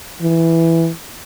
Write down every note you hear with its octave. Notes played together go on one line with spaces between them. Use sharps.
E3